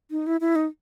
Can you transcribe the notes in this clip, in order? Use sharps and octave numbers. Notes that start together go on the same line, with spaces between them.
D#4
E4
E4
D#4